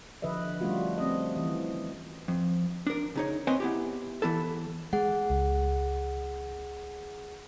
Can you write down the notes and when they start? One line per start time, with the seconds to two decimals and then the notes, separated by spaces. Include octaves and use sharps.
0.22 D3 F3 B4 D#5 E5
0.61 G3 A3 C#4 F4 F#4
0.98 C4 D#5
1.37 E3
2.28 F2
2.87 D4 A#4
3.15 C#3 D#4 C#5
3.47 C4 B4 C#5 D#5 G5 G#5
3.60 B3 E4 G4
4.22 E3 B3 E4 A4
4.93 G#3 G#4 F#5
5.30 C#2